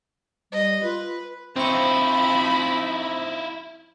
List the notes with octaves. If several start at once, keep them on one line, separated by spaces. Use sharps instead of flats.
G3 D#5
F4 B4
F3 C4 D#4 E4 B5 C#6